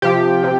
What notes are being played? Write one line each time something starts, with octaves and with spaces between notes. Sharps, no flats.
C3 F3 G4
C3 F3